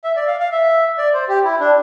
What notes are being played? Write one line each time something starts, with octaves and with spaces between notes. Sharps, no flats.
E5
D5
F5
F5
E5
D5
C5
G4
E4
D4